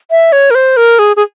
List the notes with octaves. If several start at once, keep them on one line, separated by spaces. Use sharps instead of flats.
E5
C#5
A#4
C5
A#4
G#4
G#4